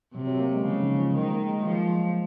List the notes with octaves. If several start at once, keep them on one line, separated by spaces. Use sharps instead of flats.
C3 F#3
F#3
A#3
G#3
C#3 F3
D#3
F3
D#3 G#3
A#3
G#3
F#3
F3 G#3